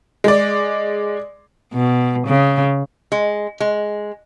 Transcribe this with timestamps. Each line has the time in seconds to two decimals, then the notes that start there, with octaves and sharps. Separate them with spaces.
0.24 G#3 D5
1.73 B2
2.27 C#3
3.12 G#3
3.60 G#3